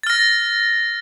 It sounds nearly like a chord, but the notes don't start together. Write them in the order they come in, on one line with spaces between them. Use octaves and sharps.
A6 F6 A#6